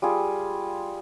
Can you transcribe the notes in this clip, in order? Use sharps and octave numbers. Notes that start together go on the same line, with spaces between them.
G3 F4 G#4